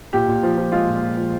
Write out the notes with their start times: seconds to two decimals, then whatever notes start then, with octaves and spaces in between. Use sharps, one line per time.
0.13 A#2 G4
0.28 A#2
0.43 F3
0.58 F3
0.72 G#3 F4
0.87 A#2
1.02 A#2
1.17 F3